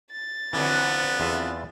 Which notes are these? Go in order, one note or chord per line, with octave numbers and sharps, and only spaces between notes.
A6
F2 D3 E3 F#3 B3
E2 F4 E5